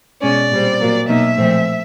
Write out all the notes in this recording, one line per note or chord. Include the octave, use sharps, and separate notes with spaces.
B2 G#3 C#4 D5
A#2 G3 C4
A#2 F#3 A#3
B2 F#3 A#3 D#4 E5
A#2 F3 A3 C4